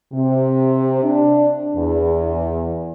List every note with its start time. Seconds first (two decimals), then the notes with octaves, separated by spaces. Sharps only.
0.13 C3
1.04 D4
1.77 E2